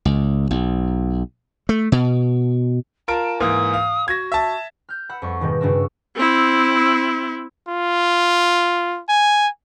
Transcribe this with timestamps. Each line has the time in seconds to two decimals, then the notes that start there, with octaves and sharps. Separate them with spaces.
0.05 C#2
0.51 B1
1.69 A3
1.92 B2
3.08 F4 A#4 A5 D7
3.40 G#2 E3 A#3 D#6
3.74 F5
4.08 F#4 G#6 A#6
4.32 E5 A5
4.89 F6 G6
5.09 F#5 B5 E6
5.22 F2 G3 C#6
5.41 G#2 B2 D#3 G3 A#3
5.61 G2 C#3 D4 F#4 C#6 E6
6.16 C4 E4
7.68 F4
9.09 G#5